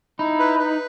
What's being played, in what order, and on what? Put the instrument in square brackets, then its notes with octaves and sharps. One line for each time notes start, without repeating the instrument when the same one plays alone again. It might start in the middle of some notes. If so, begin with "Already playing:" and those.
[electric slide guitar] D#4 [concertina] E4
[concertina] B4
B4